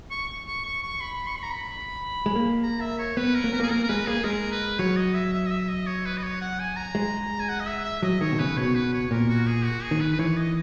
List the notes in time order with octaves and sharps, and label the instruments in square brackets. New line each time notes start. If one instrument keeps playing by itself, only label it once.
[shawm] C#6
C#6
C#6
C#6
B5
C#6
B5
A#5
B5
[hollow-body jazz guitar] G#3
A#3
[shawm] A#5
E5
C#5
[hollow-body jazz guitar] B3 [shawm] B4
[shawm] A#4
[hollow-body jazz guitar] A#3
[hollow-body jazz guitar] B3 [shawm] A#4
[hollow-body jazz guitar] A#3
[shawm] G#4
[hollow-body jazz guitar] A#3 [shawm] A#4
[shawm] A#4
[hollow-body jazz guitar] G#3 [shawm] B4
[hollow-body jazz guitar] A#3 [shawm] G#4
[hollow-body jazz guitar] G#3 [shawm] A#4
[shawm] B4
[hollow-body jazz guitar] F#3 [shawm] C#5
[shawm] D#5
E5
E5
D#5
E5
D#5
C#5
B4
D#5
C#5
F#5
G#5
A#5
[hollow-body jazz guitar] G#3
[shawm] G#5
F#5
D#5
E5
E5
[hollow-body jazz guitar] F#3 [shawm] D#5
[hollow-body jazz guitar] D#3 [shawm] C#5
[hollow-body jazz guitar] B2
[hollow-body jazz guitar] C#3 [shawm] B4
[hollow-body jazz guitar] B2 [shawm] C#5
[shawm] B4
C#5
[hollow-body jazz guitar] A#2 [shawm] A#4
[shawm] F#4
G#4
F#4
G#4
[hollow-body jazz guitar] D#3
[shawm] B4
B4
[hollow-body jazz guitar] E3 [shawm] C#5
[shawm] D#5